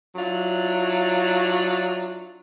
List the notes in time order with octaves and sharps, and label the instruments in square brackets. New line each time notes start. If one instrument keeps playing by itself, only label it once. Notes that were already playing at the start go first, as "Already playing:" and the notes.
[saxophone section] F#3 D4 E4 F4